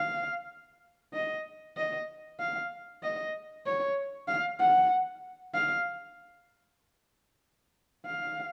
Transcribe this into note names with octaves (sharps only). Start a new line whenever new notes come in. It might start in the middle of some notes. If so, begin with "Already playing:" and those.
Already playing: F5
D#5
D#5
F5
D#5
C#5
F5
F#5
F5
F5